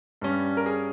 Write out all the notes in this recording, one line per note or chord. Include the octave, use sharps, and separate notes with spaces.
G2 G3 C#4
A#4
G#4